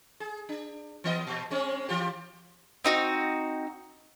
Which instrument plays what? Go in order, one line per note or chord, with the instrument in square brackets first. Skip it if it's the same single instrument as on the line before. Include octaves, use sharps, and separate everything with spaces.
[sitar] G#4
D4
E3 B3 D#5
A#2
G#3 C4 C#4
E3 F4 G4
[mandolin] C4 D#4 F#4